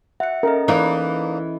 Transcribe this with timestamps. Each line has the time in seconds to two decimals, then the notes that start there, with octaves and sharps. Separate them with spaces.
0.20 E5 F#5 C#7
0.43 C#4 A4 A#4 D#5
0.68 E2 E3 A#3 D#4